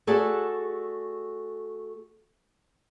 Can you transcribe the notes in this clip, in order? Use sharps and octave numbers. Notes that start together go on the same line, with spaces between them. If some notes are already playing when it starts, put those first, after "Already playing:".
A3 F#4 G#4 A4 D5 F#5